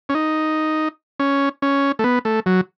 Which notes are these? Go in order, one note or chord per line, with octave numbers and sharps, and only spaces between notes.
C#4
D#4
C#4
C#4
A3
B3
A3
F#3